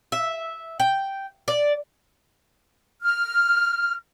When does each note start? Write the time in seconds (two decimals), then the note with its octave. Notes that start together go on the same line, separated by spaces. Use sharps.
0.12 E5
0.80 G5
1.48 D5
3.03 F6